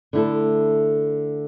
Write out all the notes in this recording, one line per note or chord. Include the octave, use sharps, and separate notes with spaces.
D3 A3 E4 A4